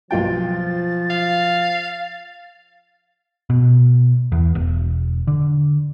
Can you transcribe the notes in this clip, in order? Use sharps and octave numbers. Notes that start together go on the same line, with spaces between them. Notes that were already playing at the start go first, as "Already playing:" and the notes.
B1 F3 F4 G5 A6
F5
B2
E2
E1
D3